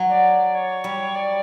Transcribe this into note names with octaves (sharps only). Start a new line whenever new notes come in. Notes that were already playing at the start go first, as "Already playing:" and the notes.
Already playing: F#3
D5
C#5
G3
D5